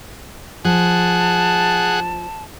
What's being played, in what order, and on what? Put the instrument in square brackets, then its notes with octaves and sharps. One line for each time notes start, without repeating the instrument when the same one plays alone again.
[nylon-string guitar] F3 [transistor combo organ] G#4 F#5 [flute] A5